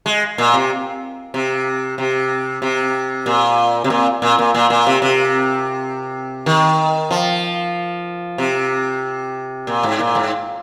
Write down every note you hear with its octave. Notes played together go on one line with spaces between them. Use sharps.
G#3
A#2
C3
C3
C3
C3
A#2
C3
A#2
A#2
A#2
A#2
A#2
C3
C3
D#3
F3
C3
A#2
G#2
A#2
G#2